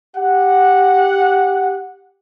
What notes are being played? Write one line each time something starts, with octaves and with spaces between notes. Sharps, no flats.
G4 F#5